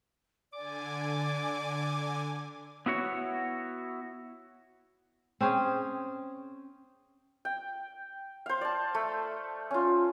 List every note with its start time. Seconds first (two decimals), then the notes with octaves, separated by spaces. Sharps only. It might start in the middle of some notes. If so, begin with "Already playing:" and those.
0.53 D3 D5 G#5 D6
2.86 B3 E4 F#4 C#5
5.41 C4 C#4 G#4
7.45 G5
8.46 C5 F5
8.61 D5 A5
8.95 A3
9.71 C#4 F4